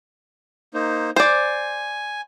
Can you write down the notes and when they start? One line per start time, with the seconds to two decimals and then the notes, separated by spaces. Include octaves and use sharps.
0.74 A#3 D#4 C5
1.16 C5 D5 G#5